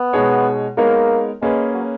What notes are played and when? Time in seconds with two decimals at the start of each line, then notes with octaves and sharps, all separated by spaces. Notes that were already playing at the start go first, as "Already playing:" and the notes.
Already playing: B3
0.13 B2 G#3 D#4 G#4 C#5
0.77 G#3 A#3 B3 D#4 A#4 C#5
1.42 G#3 A#3 C#4 G#4 B4
1.74 F#3